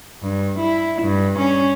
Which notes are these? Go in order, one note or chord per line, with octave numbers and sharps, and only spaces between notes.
G2
E4
G2
C#4